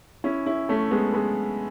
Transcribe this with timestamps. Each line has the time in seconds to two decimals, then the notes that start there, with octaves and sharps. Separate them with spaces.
0.24 C#4 E4
0.46 C#4 E4
0.69 A3 C#4
0.91 G#3 B3
1.14 G#3 B3